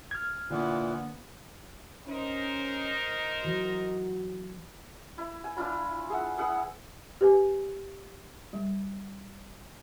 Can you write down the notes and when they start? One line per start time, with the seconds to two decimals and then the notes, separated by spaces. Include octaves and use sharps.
0.11 F6 G#6
0.50 A#2 D3 E3 A#3 B3
2.08 C#4 D#4 A#4 C5
3.45 E3 F#3 F#4
5.18 E4
5.44 G#5
5.56 D4 E4 F4 B5
6.10 G#4 E5 F#5
6.37 B3 E4 G#4 F#5
7.21 G4 B4 G#5
8.53 G3